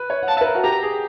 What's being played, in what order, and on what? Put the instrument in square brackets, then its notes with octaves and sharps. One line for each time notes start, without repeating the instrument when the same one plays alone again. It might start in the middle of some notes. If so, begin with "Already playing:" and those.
Already playing: [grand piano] B4
C#5
F#5
[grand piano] F5 [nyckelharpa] A5
[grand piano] E5
B4
A#4
F#4
[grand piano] G4 [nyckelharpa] A#5
[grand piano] G#4